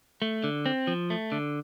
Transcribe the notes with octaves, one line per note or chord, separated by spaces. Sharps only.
A3
D3
C4
F3
A3
D3